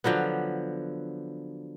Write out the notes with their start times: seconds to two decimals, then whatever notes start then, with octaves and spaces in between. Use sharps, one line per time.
0.04 D3 F3 F#3 B3